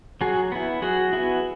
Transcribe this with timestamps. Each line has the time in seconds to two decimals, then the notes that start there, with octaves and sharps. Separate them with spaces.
0.21 F#3 F#4 G#4
0.52 B3 E4
0.82 F#3 F#4 G#4
1.13 B3 E4